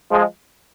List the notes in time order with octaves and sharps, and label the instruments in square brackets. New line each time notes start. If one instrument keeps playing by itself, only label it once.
[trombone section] F3 G#3